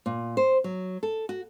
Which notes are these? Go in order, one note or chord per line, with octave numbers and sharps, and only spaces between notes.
A#2
C5
F#3
A4
F#4